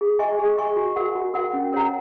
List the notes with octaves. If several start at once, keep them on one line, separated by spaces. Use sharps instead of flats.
G#4
D#5 G#5 C#6
G#4
D#5 G#5 C#6
F#4
A#4 F#5
F#4
A#4 F#5
C#4
A#4 C#5 F#5 A#5